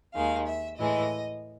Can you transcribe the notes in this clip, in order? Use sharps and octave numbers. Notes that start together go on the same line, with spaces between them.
D#2 D#3 G#3 F5
E5
A2 E3 G#3 D#5